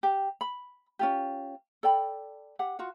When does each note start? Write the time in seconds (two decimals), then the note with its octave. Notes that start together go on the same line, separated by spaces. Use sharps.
0.03 G4 G5
0.41 B5
0.99 C#4 F4 G4
1.83 A4 D5 G5 B5
2.59 G4 F#5
2.79 F4 F#4 F#5